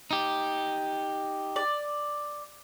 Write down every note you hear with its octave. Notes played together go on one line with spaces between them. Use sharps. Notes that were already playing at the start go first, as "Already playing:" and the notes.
D#4 G4
D5